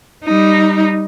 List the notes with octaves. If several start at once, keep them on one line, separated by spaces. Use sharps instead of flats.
G3 D#4